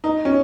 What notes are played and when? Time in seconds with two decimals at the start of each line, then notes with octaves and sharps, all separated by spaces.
0.04 D#4
0.25 C#4